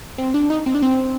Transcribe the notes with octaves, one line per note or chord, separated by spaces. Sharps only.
C4
D4
D#4
C4
D4
C4